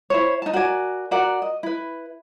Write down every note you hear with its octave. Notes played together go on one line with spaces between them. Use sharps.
E4 C5 C#5
D#4 A5
F#4 A#4 D5 G#5
F#4 A#4 D5 F#5
D#5
E4 B4